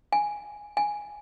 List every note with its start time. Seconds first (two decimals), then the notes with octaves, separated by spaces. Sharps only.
0.12 G#5
0.77 G#5